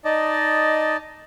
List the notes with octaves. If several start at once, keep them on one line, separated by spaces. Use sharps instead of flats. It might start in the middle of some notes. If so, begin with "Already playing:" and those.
D#4 D5 D#5 A5